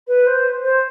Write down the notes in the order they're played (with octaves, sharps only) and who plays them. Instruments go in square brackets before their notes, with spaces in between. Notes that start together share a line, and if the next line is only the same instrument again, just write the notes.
[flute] B4
C5
C5